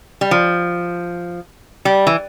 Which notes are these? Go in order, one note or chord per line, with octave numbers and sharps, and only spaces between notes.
G3
F3
G3
E3